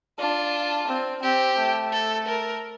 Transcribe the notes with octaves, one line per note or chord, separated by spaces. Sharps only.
D4 F4
C4
C4 G4
A3
A4
A#4